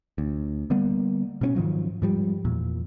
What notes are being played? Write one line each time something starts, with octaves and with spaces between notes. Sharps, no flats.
D2
D3 G3 A#3 B3
B2 B3 C#4
G#2 D#3 F3 F#3
G#2 F3 G3
E2 A#2